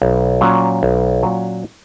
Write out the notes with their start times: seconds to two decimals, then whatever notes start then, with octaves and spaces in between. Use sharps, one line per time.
0.02 B1
0.41 A#2 F#3 C#4
0.83 B1
1.23 A#2 F#3 C#4